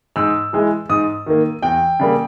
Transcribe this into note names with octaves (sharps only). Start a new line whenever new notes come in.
G#2 E6
E3 G#3
G#2 D#6
D#3 A#3
E2 G5
C#3 G3 A#3